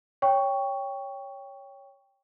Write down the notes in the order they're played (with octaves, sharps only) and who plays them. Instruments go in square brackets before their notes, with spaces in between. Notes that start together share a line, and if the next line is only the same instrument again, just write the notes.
[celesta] C#5 G5 C#6